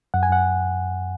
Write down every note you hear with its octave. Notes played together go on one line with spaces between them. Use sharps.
F#2 F#5
G#5
F#2 F#5